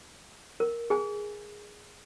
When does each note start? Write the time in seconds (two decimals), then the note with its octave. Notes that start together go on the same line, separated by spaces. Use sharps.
0.60 A#4
0.90 G#4 G#5